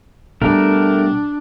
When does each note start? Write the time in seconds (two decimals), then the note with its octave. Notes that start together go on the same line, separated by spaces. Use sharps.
0.42 B2 G3 A3 D4 A#4